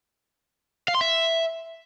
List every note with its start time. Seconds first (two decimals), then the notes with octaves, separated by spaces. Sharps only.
0.88 F5
0.95 C6
1.01 E5